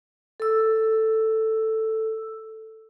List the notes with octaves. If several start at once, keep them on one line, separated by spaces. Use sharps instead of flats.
A4 E6